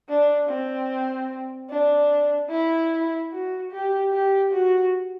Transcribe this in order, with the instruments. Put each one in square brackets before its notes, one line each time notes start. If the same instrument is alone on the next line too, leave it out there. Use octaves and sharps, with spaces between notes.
[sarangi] D4
C4
D4
E4
F#4
G4
G4
F#4